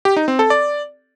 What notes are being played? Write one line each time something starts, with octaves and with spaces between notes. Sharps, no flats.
G4
D#4
C4
A4
D5